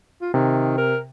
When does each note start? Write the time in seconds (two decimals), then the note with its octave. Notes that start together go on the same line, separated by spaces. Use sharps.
0.21 F4
0.34 C3 D#3
0.78 A#4